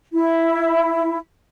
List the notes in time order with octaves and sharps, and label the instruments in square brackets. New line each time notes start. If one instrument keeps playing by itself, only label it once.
[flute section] E4